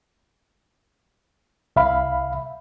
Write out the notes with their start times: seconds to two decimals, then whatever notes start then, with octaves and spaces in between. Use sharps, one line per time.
1.76 C2 E5 F5 B5